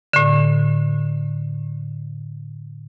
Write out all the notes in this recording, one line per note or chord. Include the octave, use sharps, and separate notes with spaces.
A2 D3